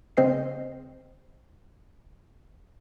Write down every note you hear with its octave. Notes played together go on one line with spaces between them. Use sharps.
C#3 C4 C5 D#5 F6 C7